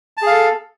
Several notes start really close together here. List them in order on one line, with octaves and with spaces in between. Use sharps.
A5 G#4 F5 A4